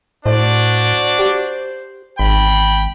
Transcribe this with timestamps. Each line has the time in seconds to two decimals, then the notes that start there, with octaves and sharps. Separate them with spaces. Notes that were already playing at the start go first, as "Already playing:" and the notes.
0.26 A2 D4 F#4 C5 D5
1.19 G4
2.19 G#1 G5 B5